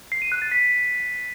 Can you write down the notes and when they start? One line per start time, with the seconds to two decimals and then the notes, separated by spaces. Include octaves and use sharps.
0.12 C7
0.22 D#7
0.32 F#6
0.42 A6
0.52 B6